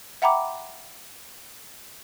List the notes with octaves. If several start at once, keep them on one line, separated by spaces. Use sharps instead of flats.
E5 F#5 G5 A#5 B5 D6